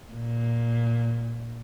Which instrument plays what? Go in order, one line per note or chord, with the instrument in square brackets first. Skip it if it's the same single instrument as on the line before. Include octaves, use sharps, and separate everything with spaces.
[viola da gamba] A#2